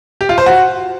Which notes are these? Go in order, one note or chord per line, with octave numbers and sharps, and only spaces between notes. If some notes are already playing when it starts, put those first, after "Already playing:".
G4
F4
C5
F#4